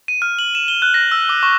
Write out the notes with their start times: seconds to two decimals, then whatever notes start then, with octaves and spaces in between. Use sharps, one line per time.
0.08 D#7
0.22 F6
0.39 F#7
0.55 E7
0.68 G7
0.82 F#6
0.94 A#6
1.12 E6
1.29 D6
1.43 C#6